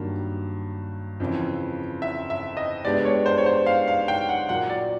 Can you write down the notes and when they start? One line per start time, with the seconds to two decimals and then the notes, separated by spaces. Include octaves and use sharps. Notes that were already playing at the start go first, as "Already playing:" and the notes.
Already playing: G2 D#3 F#3 A#3
1.20 F2 C#3 E3
2.02 E5
2.30 E5
2.57 D#5
2.85 G#3 B3 D4 G4 D5
3.05 C#5
3.26 C5
3.38 C#5
3.46 C5
3.66 F5
3.88 F5
4.08 G5
4.29 F#5
4.49 A#2 F#3 A#3 F#5
4.70 D5